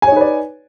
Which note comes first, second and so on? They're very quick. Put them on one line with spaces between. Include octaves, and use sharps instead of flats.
G#5 C#5 D#4 B4 D5